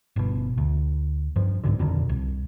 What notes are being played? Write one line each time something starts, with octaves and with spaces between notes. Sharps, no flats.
G1 B2
D2
G2 F3
C2 G#2 B2 D3
F2 B2 D3 D#3
C2